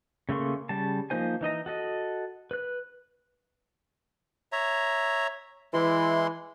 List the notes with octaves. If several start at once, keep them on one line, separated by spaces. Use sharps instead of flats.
C#3 A3 A#3 C6 C#6
C#3 G3 A5
F3 A#3 D#4 C5 G#5
E3 D#4 D#5 A#5
F#4 A4 D#5
B4 F#6
C#5 E5 A#5
E3 G#3 E4 C6